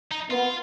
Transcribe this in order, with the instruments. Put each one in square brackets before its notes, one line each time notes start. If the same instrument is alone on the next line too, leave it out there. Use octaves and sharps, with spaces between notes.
[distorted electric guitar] D#4
[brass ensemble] B3 [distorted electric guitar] F4